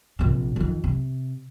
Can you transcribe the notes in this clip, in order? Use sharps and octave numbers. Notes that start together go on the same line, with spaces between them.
A#1 C3
F2 D#3
C3